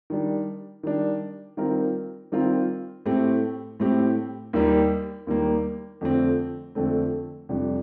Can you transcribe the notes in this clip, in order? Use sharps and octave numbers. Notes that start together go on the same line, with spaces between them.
D#3 G3 D4
D#3 G3 D4
D#3 G3 C4 F4 A#4
D#3 G3 C4 F4 A#4
A2 A3 C4 G4
A2 A3 C4 G4
D#2 D#3 G3 A#3
D#2 D#3 G3 A#3
F2 D3 A3 C4
F2 D3 A3 C4
F2 C3 G3 D4